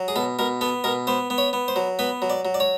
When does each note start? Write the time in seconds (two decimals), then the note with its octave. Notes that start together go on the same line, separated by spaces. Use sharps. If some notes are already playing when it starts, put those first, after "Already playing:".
Already playing: F#3
0.08 G#4
0.16 B2 A4
0.39 B2 A#4
0.61 B3 A4
0.84 B2 A#4
1.07 B3 C5
1.30 B3
1.38 C#5
1.53 B3
1.68 C5
1.76 F#3
1.99 B3 B4
2.22 F#3
2.30 D5
2.45 F#3
2.54 D5
2.60 C#5